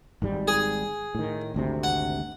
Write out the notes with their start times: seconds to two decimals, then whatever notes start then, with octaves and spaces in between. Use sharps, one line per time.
0.22 G#1 G#2 G3
0.48 G#4
1.15 A2 D#3
1.54 G#1 D2 C3
1.84 F#5